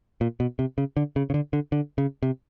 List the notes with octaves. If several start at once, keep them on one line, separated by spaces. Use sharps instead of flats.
A#2
B2
C3
C#3
D3
C#3
C#3
D3
D3
D3
C#3
C3